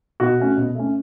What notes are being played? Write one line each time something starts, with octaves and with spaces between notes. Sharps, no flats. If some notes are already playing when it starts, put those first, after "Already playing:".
B2 F#4
A3 C#4
B2
A3 C#4